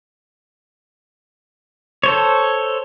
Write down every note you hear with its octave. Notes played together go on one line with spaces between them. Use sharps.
A4 C5 C#5